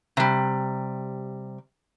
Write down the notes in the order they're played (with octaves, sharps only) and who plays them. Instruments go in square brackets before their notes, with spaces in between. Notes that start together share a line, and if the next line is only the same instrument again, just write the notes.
[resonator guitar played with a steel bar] C3 G3